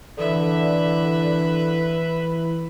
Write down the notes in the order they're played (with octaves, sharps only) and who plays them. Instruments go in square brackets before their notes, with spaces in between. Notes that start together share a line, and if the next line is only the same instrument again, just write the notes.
[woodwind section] D3 [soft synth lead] E3 [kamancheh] B4 [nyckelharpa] E5